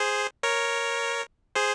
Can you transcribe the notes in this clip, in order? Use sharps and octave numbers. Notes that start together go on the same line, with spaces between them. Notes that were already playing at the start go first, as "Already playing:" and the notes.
Already playing: G#4 C5
A#4 C#5
G#4 C5